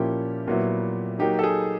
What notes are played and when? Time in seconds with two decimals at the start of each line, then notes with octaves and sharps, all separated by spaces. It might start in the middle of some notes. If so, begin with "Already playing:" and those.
Already playing: A#2 F3 A#3 C#4 E4 G4
0.48 A#2 F#3 B3 E4
1.19 F#3 A#3 D#4 G4
1.39 A4
1.43 G#4